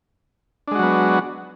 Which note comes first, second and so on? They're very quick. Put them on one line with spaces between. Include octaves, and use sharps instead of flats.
D4 G#3 F#4 F#3 B3